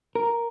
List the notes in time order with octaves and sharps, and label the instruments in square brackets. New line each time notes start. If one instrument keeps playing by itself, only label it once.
[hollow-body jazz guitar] A#4